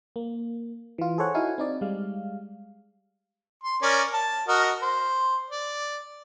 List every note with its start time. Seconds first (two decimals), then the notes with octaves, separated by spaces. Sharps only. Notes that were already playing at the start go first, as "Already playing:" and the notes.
0.16 A#3
0.98 E3 F4
1.18 G#4 A4 C5 C#5 F#5
1.34 D#4 E4 F#4 F5 G#5
1.58 C4 D#4 D5
1.81 G3 G#3 F5
3.63 C6
3.82 C#4 A#4 D5
4.14 A5
4.48 F#4 A#4 D#5
4.82 C5
5.50 D5